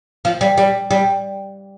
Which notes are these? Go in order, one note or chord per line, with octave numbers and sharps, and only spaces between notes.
F3
G3
G3
G3